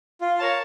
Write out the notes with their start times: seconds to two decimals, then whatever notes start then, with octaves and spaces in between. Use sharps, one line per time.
0.21 F4
0.39 A#4 C#5 F5 A5